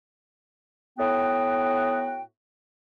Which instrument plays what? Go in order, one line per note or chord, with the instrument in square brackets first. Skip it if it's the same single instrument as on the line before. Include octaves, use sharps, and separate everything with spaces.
[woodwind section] A2 B3 F#4 G5